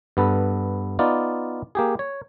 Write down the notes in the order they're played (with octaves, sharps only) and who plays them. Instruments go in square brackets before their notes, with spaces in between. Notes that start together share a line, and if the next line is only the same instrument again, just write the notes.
[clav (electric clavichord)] G2 B3 A4 B4
B3 D#4 F4 D5
A#3 G4 G#4
C#5